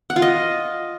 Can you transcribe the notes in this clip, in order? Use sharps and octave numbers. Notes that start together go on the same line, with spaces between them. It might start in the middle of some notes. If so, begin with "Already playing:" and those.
F#5
F4
D#5